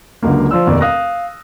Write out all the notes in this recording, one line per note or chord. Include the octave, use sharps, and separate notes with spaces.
C#2 D3 F#3 A#3
F3 F4 D5 E6
F1 D#2 B2 D5
F5 D#6 F#6 A#6